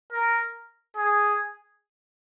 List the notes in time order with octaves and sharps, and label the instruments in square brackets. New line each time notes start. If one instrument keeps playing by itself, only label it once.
[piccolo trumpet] A#4
G#4